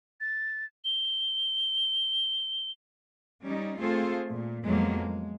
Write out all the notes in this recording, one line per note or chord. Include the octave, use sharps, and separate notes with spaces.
A6
G7
G3 C#4 D#4
A3 C4 F4 G#4 A4 C5
A#2
F2 A2 F#3 G#3 A#3 B3
G#3